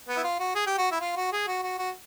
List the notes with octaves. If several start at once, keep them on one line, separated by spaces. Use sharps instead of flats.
B3
E4
F4
F#4
G#4
G4
F#4
E4
F4
F#4
G#4
F#4
F#4
F#4